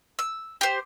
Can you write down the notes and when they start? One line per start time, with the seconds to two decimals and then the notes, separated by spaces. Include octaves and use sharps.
0.19 E6
0.61 G4 C5